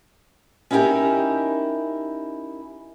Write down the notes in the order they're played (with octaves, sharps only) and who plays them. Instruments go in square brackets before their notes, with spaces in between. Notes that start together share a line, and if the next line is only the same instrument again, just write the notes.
[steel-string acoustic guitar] C#4 D#4 E4 F#4 G4 A#4